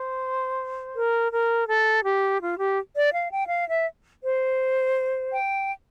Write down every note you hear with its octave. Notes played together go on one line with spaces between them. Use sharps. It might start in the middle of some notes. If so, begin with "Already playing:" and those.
Already playing: C5
A#4
A#4
A4
G4
F4
G4
D5
F5
G5
F5
E5
C5
G5